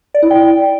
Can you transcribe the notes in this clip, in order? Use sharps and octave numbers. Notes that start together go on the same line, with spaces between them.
D5
E4
G5